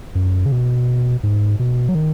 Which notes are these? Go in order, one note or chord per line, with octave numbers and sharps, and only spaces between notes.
F#2
C#3
B2
G#2
B2
F#3
D#3